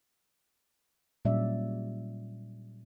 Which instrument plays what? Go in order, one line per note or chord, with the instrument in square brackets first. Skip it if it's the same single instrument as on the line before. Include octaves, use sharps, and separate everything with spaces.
[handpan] A#2 F#3 G3 C#4 D5 E5